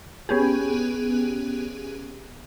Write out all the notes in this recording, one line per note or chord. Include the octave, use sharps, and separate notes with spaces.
B3 C#4 G4 G#4